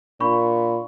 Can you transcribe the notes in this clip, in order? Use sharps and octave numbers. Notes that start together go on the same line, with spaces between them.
A#2 D4 B5 C#6